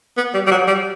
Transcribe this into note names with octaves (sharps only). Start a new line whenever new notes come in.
B3
G3
G3
F#3
G3